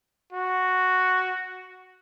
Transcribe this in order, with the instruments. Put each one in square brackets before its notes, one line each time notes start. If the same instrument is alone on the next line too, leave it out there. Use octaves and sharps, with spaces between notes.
[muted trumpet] F#4